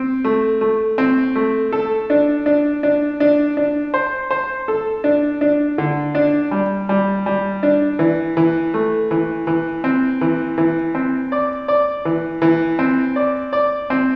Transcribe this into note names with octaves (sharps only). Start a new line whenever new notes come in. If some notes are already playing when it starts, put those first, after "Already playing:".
Already playing: C4
A3
A3
C4
A3
A4
D4
D4
D4
D4
D4
C5
C5
A4
D4
D4
D3
D4
G3
G3
G3
D4
E3
E3
A3
E3
E3
C4
E3
E3
C4
D5
D5
E3
E3
C4
D5
D5
C4